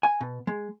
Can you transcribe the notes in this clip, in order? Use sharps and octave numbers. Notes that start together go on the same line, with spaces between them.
G#5
B2
G#3